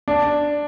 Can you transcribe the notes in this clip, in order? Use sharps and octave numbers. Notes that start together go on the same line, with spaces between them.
D4